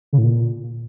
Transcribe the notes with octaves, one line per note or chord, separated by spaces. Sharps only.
C#3
A2
A#2